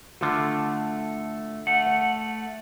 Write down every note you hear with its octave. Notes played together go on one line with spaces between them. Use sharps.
D3 A3 F4
A3 F#5